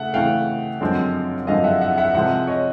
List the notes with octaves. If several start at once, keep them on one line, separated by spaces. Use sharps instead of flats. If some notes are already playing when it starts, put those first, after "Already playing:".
Already playing: C#3 A3 E5 F#5
C#3 E3 A3 F5 G5
F#2 D3 F3 G#3 C4
F#2 D3 F3 G#3 C4 D#5 F5
E5 F#5
E5 F#5
E5 F#5
C3 F3 G#3 C4 E5 F#5
C#5 D#5